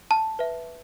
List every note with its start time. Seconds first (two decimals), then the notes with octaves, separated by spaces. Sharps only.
0.11 A5
0.39 B4 E5